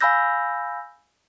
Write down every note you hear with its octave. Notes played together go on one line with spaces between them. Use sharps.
F5 G#5 B5 E6 G6 A#6